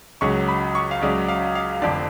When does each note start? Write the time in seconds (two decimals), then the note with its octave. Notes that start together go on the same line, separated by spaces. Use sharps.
0.21 C#2 C#3 F#3 C#6
0.48 B5
0.75 C#6
0.91 F5
1.01 C#2 C#3 F#3 D5
1.28 F5
1.55 F5
1.82 F1 F2 D3 D5